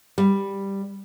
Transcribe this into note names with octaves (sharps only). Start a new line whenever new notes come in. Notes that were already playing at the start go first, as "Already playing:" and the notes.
G3